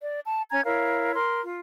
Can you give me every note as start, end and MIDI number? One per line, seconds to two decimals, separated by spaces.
0.01 0.20 74
0.25 0.41 81
0.51 0.60 61
0.51 0.60 80
0.51 0.60 82
0.51 0.60 92
0.64 1.13 64
0.64 1.13 70
0.64 1.13 73
0.64 1.13 77
1.15 1.41 70
1.15 1.41 84
1.42 1.59 65